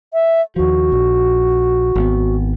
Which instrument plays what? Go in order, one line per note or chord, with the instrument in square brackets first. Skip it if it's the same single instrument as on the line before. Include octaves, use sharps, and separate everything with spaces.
[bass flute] E5
[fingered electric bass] D#2 F3 [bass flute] F#4
[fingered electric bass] A#1
G#1 B3